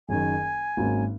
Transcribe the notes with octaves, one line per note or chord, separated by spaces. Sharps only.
F#1 F#2 D#3 G#5
G#1 G#2 F#3 A#3 C#4